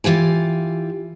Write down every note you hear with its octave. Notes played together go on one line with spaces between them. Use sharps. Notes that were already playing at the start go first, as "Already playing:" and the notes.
E3 F4 G4 G#5